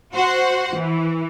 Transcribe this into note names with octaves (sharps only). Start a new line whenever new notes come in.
F#4 C5 F#5
E3